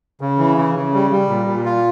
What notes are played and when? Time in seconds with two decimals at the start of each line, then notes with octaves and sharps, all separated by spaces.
0.21 C#3
0.38 E3
0.57 C#3
0.75 C#3
0.93 G3
1.11 G3
1.29 A#2
1.47 A#2
1.65 F4